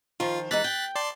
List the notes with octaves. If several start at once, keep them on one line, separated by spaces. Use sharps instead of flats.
D#3 F3 F4
E3 G#3 D#4 F#6 A6 B6
G5
D5 A5 C6